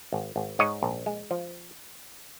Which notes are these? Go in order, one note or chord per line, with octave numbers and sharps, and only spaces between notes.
G#1
G#1
G#2 C#5 D#5
A#1
G#3
F3